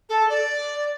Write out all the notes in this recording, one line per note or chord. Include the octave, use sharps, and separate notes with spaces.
A4
D5